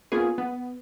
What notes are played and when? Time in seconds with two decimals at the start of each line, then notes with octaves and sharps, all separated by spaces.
0.12 A#3 B3 C#4 F4 G#4
0.38 B3